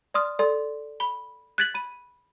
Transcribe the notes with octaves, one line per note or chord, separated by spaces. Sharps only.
D5 C6 D#6 F6
A4 D5 C6
B5 G7
F#6 G#6 A6 B6 F#7
B5 D#7